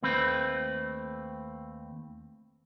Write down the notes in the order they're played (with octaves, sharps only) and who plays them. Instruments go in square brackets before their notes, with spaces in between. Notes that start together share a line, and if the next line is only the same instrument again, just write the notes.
[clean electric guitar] D#2 A3 C4 B4